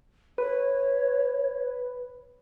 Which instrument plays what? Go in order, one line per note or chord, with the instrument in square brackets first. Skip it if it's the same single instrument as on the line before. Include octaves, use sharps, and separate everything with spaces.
[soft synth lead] B4 [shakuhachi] C#5